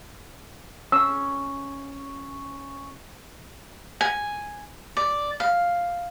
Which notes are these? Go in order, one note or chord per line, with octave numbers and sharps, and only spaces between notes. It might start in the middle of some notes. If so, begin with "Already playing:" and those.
C#4 E6
G#5
D5
F5